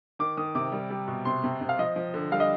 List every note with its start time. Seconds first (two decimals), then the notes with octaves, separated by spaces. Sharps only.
0.19 D#3 D6
0.37 D#3 D#6
0.55 C3 D6
0.72 G3
0.90 G3
1.08 B2
1.25 C3 C6
1.44 C3
1.61 C3
1.69 F5
1.79 F3 D#5
1.96 F3
2.14 D3
2.31 G3 F5
2.40 D#5